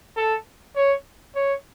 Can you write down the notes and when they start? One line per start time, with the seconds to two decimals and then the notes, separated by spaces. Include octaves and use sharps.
0.17 A4
0.76 C#5
1.35 C#5